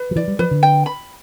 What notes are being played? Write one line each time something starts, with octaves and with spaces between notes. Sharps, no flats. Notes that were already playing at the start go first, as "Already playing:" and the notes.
Already playing: B4
F3
E3 D5
G3
F3 B4
D3
G5
B5